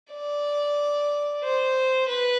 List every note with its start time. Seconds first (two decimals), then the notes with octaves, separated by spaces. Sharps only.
0.12 D5
1.44 C5
2.09 B4